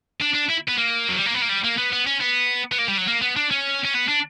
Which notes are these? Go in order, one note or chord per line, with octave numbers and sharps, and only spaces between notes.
D4
D4
E4
B3
A#3
F#3
G3
A#3
B3
A#3
G3
A#3
B3
B3
C#4
B3
B3
A#3
G3
F#3
A#3
B3
D4
C#4
C#4
B3
D4